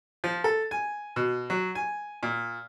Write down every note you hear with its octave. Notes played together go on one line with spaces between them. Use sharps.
F3
A4
G#5
B2
F#3
G#5
A#2